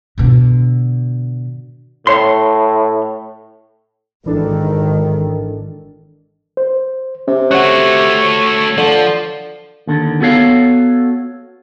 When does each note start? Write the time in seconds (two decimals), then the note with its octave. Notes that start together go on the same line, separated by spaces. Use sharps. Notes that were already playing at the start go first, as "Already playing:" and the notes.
0.18 B2 D3
2.07 A2 C#5 C6
4.26 G#1 D#3 E3 D4 A4
6.57 C5
7.28 C3 C#4
7.51 A3 F#4 C#5 F#5 F#6
8.78 D3 F3
9.87 D#2 D3
10.21 B3 F#4 A4 C#5 F5